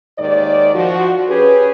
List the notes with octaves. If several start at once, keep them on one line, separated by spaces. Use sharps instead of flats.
D#2 G#2 D#3 D5
F3 F#4
C#4 G4 G#4 B4